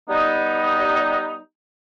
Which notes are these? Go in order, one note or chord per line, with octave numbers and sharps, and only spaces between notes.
G3 B3 D#4